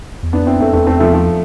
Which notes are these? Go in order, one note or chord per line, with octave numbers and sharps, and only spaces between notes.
E2
F2 B3 D4
C4 E4
A3 C4
E2 A3 C4
A3 C4
F3 A3
F3 A3